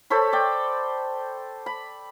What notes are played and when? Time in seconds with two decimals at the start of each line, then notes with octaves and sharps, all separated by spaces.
0.10 A4 C5 C#5 B5
0.33 D5 G5
1.66 B5